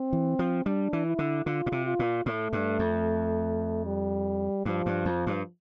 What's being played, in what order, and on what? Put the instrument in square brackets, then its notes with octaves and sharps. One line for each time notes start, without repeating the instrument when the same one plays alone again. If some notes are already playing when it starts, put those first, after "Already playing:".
Already playing: [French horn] C4
[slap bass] E3
F3
[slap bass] G3 [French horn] D4
[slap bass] E3
[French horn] E4
[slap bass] D3
[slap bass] D3 [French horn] F4
[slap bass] A#2
C3
[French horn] F4
[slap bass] A#2
[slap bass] A2 [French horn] A3
[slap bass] G2
F2
[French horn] G3
[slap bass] G2 [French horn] F3
[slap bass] G2
F2
G2